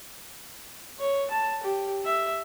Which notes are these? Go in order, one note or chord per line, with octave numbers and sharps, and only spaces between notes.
C#5
A5
G4
E5